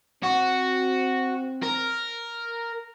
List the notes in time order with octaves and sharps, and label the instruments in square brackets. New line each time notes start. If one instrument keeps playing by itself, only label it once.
[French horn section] C4 [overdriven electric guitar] F#4
[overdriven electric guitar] A#4